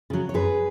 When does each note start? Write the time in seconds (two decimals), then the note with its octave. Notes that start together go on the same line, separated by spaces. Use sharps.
0.10 C#3 F#3
0.29 C#5
0.34 F#2 G#4 B4